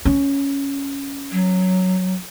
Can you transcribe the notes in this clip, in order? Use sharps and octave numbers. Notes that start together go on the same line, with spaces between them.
C#4
F#3